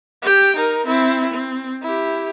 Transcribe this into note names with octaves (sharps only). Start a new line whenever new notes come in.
G4 G5
D#4 A#4
C4 E4
C4
E4 G4